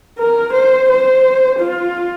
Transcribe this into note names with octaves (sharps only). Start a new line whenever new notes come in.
A#4
C5
C5
F4